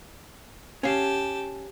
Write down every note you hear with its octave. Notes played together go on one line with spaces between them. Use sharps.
C#4 G4 F5 A5